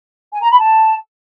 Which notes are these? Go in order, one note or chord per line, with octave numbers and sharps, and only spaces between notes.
G#5
A#5
B5
A5